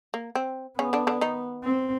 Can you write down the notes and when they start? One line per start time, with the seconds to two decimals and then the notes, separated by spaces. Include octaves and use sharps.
0.14 A#3
0.35 C4
0.79 C#3 B3 C#4
0.93 D3 D4
1.07 D3 D4
1.21 D#3 D#4
1.64 C4